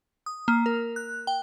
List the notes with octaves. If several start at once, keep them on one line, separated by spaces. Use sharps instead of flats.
D#6
A#3
A#4
F#6
G5